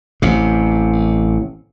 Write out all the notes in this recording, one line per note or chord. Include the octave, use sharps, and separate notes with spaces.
A1 C3